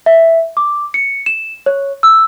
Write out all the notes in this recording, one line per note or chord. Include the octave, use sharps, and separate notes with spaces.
E5
D6
C#7
E7
C#5
E6